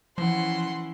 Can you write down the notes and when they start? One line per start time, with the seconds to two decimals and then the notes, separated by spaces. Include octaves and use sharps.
0.18 E3 F3 C#4 F#5 C6